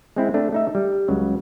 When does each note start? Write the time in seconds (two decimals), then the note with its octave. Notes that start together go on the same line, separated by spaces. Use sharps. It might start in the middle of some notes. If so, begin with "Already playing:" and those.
0.16 G#3 C4 E4
0.34 A3 D4
0.53 A3 D#4 E5
0.75 G3
1.08 C#2 C#3 F#3